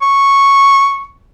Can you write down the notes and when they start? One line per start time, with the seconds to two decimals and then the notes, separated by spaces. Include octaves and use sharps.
0.02 C#6